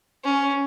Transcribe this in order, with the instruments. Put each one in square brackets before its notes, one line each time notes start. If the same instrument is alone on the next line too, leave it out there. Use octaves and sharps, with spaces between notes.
[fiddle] C#4